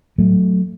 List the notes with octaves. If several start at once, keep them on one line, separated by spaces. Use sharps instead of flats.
A2 F#3 A3